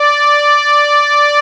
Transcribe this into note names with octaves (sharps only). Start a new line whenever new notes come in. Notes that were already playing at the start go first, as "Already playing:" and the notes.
Already playing: D5